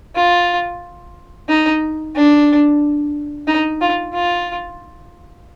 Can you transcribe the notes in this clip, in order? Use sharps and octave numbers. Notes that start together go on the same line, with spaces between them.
F4
D#4
D4
D#4
F4
F4